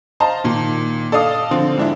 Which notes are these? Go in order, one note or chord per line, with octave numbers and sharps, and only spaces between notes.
C5 D#5 F5 A5 A#5
A#2 D#3
A4 D5 D#5 F5 D#6
D3 F3 C4
G#2 D4 E4